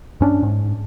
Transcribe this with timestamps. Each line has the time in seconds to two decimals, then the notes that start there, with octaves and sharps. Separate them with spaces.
0.21 G2 C#4 D4
0.43 G#2